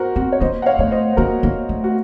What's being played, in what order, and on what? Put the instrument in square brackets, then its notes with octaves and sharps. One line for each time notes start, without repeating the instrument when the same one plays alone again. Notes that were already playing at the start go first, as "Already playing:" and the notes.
Already playing: [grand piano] F#4 A#4 C5
[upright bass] C4 [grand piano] F#4
[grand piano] C#5
[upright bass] A#3 [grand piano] C5 D#5
[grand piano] F#5
C#5 F5
[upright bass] A3 [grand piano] C#5
[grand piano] C5 D#5
C5
[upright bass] A#3 [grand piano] F#4 A#4
[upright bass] A#3
A3
[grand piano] F#4